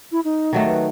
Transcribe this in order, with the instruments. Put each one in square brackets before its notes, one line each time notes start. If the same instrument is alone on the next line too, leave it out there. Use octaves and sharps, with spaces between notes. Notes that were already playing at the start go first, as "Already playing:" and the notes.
[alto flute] E4
D#4
[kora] D#3 F#3 A3
[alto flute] B4